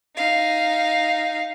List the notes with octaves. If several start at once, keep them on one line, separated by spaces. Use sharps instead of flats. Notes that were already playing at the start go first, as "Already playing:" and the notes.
D#4 F5